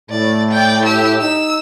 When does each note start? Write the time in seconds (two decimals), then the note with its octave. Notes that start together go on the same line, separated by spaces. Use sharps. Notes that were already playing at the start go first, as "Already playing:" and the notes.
0.10 A2 D5
0.51 D5 G5
0.85 G4 E6
1.20 D#4 E6